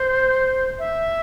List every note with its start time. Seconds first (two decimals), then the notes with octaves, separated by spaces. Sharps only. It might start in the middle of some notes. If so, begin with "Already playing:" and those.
Already playing: C5
0.79 E5